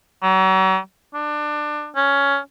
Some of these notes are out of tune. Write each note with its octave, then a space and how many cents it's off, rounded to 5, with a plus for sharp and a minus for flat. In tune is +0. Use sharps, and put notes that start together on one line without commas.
F#3 +40
D4 +25
C#4 +10